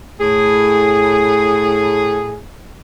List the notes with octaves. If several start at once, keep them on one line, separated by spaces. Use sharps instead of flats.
A2 G#4